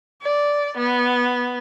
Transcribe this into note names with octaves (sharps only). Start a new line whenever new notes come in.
D5
B3